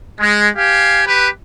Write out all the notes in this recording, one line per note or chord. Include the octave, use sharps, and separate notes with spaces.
G#3
G4 F5 G#5
G4 B4